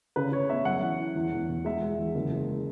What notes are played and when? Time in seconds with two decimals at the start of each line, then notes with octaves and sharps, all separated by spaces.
0.16 C#3 B4
0.32 C#3 C#5
0.49 B3 E5
0.65 F#2 F#5
0.82 E3
0.99 E3
1.16 E2
1.32 E1
1.49 E1
1.65 G#3 E5
1.83 G#3
1.98 E2
2.15 F#1
2.32 G#3